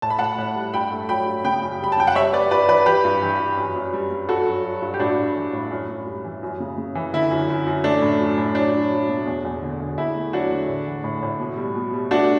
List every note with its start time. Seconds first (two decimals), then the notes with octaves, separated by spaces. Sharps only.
0.02 A2 A5
0.10 B5
0.19 A2 F#5 A5
0.38 A2
0.56 G3
0.74 G2 G5 B5
0.92 A3
1.09 F#3 G5 B5
1.26 G2
1.44 C#3 G5 B5
1.62 F#2
1.80 G3 B5
1.92 A5
1.98 F#2 G5
2.07 F#5
2.15 G3 C#5 E5
2.33 G3 B4 D5
2.51 G2 B4 D5
2.69 E3 B4 D5
2.86 E3 G4 B4
3.05 G2
3.22 E3
3.40 G2
3.57 F#2
3.76 F#2
3.93 G3
4.11 G3
4.29 G2 F#4 A4
4.47 F#3
4.64 F#3
4.82 G2
4.94 G4
4.99 A2 D4 F#4
5.18 A2
5.36 E3
5.53 A2
5.71 F#2
5.89 F#2
6.07 G3
6.25 E3
6.43 F#2
6.60 C#3
6.78 C#3
6.95 E3
7.14 D3 E4
7.31 F#2
7.49 F#2
7.67 F#2
7.84 A3 D4
8.02 A2
8.20 F#3
8.38 A2
8.55 F#3 D4
8.73 F#3
8.91 F#3
9.09 B2
9.27 E2
9.45 E2
9.62 D3
9.80 E2
9.98 E2 E4
10.15 A3
10.33 F#3 D4 F#4
10.51 D3
10.68 A2
10.87 E3
11.04 A2
11.23 A2
11.40 B2
11.57 G3
11.75 B2
11.94 G3
12.11 A3 D4 F#4